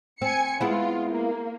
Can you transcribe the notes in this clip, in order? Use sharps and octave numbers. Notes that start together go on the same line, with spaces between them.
C4 G#5 C#7
G#3 B3 E4 F4
A#3